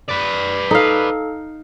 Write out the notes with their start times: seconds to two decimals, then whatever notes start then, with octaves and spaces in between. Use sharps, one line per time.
0.08 B4 D5
0.71 D#4 A4 F5